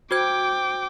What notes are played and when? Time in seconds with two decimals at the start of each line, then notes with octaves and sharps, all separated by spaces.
0.11 F#4 C5 G5 D6 G#6